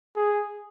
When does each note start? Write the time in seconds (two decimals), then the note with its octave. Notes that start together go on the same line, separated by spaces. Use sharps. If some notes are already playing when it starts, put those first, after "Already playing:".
0.16 G#4